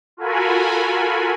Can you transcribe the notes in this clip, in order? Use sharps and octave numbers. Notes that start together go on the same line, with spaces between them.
F4 F#4 A4 A#4 G#5 B5